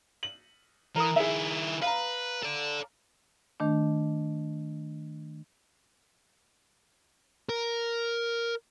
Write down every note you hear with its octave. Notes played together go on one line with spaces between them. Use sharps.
F#7
E3 A#4 D#6
D#3 E4 G#4 E5
B4 F5 A#5
A4 D5
D#3 A3 D4
A#4